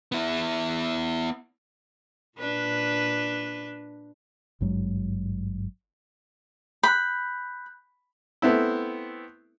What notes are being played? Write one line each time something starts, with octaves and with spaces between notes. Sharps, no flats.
B3 E4
A#2 D4 B4
G#1 G2 F#3 G#3
B5 F#6 G6
A3 B3 C4 E4